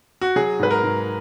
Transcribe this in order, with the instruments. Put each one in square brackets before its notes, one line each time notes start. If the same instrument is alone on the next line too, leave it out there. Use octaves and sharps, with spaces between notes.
[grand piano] F#4
F#3 G#4
G#2 B4
A#4
G#2